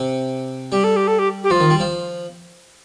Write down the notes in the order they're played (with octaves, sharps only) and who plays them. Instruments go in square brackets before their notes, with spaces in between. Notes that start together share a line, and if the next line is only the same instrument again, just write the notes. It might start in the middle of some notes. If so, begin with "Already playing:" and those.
Already playing: [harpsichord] C3
[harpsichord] G3 [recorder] G4
[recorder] A4
G4
A4
G4
G4
[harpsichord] F3 [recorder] F4
[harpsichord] D#3
G3
F3